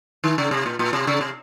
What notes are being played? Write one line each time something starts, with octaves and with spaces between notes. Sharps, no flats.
D#3
C#3
C3
A#2
A#2
C3
C#3
C3